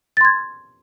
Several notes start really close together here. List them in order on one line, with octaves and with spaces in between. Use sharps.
A6 C6 G#6